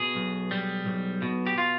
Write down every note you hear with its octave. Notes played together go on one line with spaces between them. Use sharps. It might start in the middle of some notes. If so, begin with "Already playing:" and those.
Already playing: B2 G#4
B1
G3
B1
B2
G4
F4